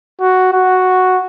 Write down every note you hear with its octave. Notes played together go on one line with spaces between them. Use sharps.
F#4
F#4